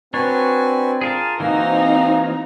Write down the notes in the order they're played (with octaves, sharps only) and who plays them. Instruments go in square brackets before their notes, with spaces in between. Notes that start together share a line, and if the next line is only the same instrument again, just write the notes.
[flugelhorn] C4 [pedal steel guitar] D4 C#5 [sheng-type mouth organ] F#4 B4 G#5
[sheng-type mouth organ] F4 [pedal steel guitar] G#4 A#4 A5
[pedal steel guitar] E3 A#3 F#4 [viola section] C4 D#4 A#5 [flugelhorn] F5 [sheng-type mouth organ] G#5